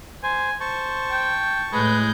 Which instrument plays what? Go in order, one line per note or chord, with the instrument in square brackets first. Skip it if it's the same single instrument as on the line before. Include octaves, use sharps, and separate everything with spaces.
[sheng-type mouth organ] C5 [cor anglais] G#5
[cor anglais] C5 [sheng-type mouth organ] A5 C#6
[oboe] G5
[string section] A2 G6 [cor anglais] G#3 [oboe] B4